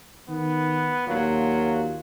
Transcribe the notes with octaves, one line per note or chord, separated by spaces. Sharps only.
D#3 B3
D#2 A#2 F#3 A#3 F4